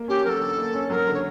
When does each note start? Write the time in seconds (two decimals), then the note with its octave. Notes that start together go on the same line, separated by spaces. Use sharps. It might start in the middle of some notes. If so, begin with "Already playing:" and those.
Already playing: A#3
0.08 C#4 G4
0.25 F#3 A4 A#4
0.41 D3
0.58 A#3
0.74 C#4
0.90 F#3 A#4
1.07 D3
1.14 C#5